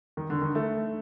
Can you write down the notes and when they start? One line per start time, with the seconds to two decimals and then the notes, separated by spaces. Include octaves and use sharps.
0.17 D#3
0.30 D3
0.42 D#3
0.55 A3